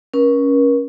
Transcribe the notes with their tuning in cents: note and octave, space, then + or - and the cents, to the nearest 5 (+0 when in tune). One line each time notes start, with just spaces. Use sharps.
C#4 +0 A#4 +40